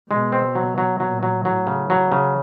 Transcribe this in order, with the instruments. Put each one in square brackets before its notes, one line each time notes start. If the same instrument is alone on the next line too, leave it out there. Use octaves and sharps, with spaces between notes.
[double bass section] B2 [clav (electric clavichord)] G#3
[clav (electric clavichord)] C4
F#3
F#3
[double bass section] A#2 [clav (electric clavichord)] F#3
[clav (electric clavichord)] F#3
[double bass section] A2 [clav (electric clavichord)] F#3
[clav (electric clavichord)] C#3
F#3
C#3